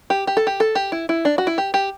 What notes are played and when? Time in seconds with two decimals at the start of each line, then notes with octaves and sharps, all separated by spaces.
0.10 G4
0.27 G4
0.37 A4
0.47 G4
0.60 A4
0.75 G4
0.92 E4
1.09 E4
1.25 D4
1.38 F#4
1.47 E4
1.58 G4
1.74 G4